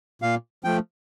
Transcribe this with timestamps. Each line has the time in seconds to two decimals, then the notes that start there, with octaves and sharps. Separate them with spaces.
0.22 A#2 F5
0.64 F3 A3 G5